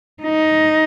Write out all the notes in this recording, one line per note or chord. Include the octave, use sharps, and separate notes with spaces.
D#4